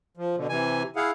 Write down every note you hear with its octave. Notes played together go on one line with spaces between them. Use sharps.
F3
B2 D3
C3 E3 G#5
E4 G#4 F5 F#5